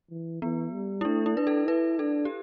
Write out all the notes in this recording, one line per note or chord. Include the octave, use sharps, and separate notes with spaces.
E3
E3 B3
G3
E4
A3 D4
E4
D4 B4
A4
E4 B4
D4 A4
G4